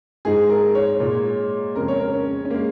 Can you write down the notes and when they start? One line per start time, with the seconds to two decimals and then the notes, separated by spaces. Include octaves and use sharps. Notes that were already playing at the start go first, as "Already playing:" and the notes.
0.25 G#2 G#3 G#4
0.50 A#4
0.75 C#5
1.00 A#2 G#3
1.76 F2 C#3 G#3 A#4
1.88 C#5
2.00 A#4
2.13 C#4
2.45 C#4
2.50 G#3 A#3